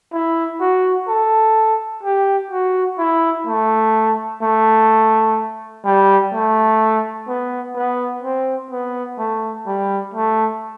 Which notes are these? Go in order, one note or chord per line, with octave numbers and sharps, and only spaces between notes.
E4
F#4
A4
G4
F#4
E4
A3
A3
G3
A3
B3
B3
C4
B3
A3
G3
A3